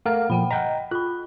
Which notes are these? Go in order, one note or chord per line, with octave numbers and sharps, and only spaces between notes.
A3 A#4 F5 F#5 F6
A#2 F3 F#5 G5 B5
D#5 F#5 G5 A#5
F4 B5 F#6